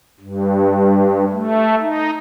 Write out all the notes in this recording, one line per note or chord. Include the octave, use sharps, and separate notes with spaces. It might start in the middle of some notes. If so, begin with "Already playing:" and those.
G2
A3
D#4